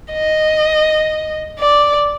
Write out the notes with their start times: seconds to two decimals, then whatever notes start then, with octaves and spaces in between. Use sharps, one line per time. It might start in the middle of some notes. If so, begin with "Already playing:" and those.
0.13 D#5
1.60 D5